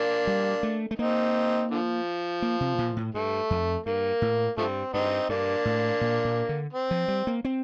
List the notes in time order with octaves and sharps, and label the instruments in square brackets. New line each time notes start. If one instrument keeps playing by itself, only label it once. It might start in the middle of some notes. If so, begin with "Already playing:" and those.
Already playing: [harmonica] A#3 D4
[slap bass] G3
A3
A3
[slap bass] A#3 [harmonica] C4 D#4
[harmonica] D3 F3
[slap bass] A#3
C3
A#2
A2
[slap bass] G2 [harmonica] A3
[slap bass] F2
[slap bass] G2 [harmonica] A#3
[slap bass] A2
[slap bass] G2 [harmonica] F3 A3 C4
[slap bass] G2 [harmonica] C4 D#4
[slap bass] G2 [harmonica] A#3 D4
[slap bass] A2
A#2
A#2
D3
[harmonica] C4
[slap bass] F3
G3
A#3
C4